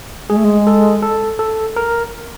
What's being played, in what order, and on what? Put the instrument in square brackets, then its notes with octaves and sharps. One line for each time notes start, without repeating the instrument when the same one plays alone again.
[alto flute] G#3 [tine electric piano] G#4
[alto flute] A3
G#3
[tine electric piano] A4
A4
A4
A#4